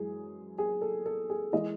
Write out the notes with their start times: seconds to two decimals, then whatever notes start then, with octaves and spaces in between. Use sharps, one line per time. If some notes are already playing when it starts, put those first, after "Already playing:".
Already playing: F#2 E3 G#3 G#4
0.58 G#4
0.81 A4
1.06 A4
1.30 G#4
1.53 E3 G#3 D#5